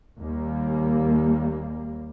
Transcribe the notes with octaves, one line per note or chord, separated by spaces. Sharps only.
D#2 G3 A#3